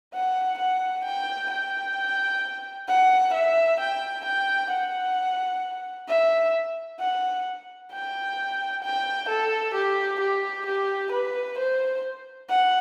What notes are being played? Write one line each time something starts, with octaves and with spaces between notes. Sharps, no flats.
F#5
F#5
G5
G5
F#5
E5
G5
G5
F#5
E5
F#5
G5
G5
A4
G4
G4
G4
B4
C5
F#5